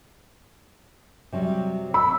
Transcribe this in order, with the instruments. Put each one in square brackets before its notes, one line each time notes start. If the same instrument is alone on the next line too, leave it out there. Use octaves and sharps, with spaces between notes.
[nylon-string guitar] C3 F#3 G3
[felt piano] B5 [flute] E6